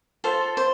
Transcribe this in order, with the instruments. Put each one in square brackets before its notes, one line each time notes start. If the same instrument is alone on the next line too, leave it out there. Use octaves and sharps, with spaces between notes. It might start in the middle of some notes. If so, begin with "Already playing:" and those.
[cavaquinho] F4 A4 C5
C5